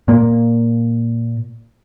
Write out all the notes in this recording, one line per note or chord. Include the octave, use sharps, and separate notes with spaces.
A#2 A#3